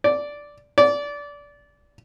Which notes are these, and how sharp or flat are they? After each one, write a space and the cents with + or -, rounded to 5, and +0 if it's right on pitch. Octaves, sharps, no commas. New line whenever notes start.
D5 -5
D5 -20